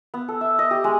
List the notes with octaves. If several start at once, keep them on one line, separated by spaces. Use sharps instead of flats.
B3
A4
E5
D#5
G4
G#3